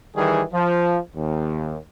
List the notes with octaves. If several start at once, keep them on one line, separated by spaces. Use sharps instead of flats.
D#3 E3 G3 G#4
F3
D#2